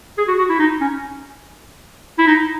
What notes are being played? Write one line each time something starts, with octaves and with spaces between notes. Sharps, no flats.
G#4
F#4
F#4
E4
D#4
C#4
E4
D#4